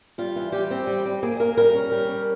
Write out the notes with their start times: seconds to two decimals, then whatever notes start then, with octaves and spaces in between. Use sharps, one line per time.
0.18 G3 F4
0.36 E3
0.52 G3 G4
0.71 C4
0.87 G3
1.05 G3
1.23 A#3 G#4
1.40 A#3 A#4
1.57 G3 A#4
1.74 C#4
1.92 G3
2.09 C#4